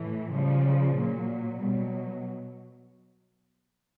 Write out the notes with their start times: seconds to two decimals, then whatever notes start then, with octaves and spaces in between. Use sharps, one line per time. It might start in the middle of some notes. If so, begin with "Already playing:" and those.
Already playing: A2 E3
0.31 C#3 F3 G3
0.95 A#2 F#3
1.58 B2 F#3 G3